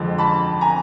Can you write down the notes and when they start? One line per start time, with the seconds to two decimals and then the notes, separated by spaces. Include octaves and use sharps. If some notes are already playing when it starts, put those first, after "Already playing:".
Already playing: F2 D3 F3 G#3
0.18 A5 B5
0.61 G#5 A#5